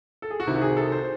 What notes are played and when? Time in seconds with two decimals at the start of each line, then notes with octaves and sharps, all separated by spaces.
0.22 A4
0.30 G#4
0.40 F#4
0.47 C2 C3 D#3 E4
0.56 F#4
0.62 G#4
0.77 A4
0.92 C5